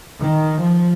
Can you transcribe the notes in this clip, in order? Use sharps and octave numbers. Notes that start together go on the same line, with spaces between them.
D#3
F3